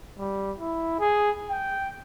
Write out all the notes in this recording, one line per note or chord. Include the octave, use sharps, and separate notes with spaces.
G3
E4
G#4
G5